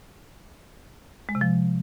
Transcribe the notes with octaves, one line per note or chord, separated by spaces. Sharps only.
G#3
C3
F3